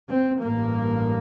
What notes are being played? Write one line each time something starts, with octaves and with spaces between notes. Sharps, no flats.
C4
A1 G2 A#3